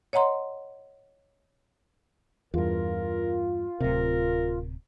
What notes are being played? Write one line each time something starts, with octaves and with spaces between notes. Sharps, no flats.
C#5 D#5 F#5 A#5 C6
E2 G2 F4 A#4
D1 C3 A#4